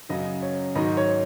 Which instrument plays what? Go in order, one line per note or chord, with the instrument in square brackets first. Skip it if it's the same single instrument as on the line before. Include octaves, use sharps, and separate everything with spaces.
[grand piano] F#2 C#3 F#3 D#5
C#5
G#2 D#3 F#3 D#5
C#5